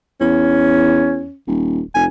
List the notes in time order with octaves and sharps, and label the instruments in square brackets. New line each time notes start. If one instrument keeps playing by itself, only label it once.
[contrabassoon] E2 [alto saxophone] C#4
[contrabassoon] D#1
[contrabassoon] F1 [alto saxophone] G#5